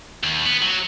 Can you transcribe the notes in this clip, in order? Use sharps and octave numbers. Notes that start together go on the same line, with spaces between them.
D#2
B3
F#3